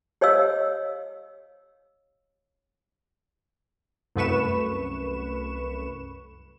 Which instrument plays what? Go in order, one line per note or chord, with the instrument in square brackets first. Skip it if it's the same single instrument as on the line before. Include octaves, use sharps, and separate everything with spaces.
[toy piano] G4 C#5 D#5 F5 E6
[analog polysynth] C2 F#2 A3 B4 C#6 E7